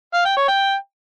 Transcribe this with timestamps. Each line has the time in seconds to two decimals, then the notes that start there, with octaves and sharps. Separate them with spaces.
0.14 F5
0.25 G5
0.37 C#5
0.48 G5